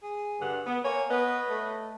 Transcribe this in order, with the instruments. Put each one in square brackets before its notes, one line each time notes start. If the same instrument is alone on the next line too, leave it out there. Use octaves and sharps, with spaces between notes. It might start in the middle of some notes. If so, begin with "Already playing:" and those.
[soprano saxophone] G#4
[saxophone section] G2 D3 F#5
B3
[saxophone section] A#3 C#5 [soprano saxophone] G#5
[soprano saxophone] B3 [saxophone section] B4 C#5 D#5
[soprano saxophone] A3